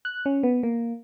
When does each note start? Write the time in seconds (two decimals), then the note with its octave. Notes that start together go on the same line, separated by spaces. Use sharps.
0.05 F#6
0.26 C#4
0.43 B3
0.63 A#3